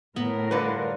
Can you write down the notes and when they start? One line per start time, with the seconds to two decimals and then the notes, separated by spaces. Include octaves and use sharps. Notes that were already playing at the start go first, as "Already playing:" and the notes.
0.16 A2 B3 A#4
0.51 D3 G3 F4 B4